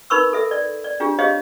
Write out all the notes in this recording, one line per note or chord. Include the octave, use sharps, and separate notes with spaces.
D#4 A#4 B4 B5 C#6 E6
A4 E5
D5
D5
D4 F4 G4 G#4
G4 G#4 C5 C#5 D#5 F5